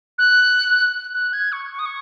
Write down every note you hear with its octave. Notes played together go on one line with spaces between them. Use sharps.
F#6
F#6
G#6
C#6
C#6
D#6
C#6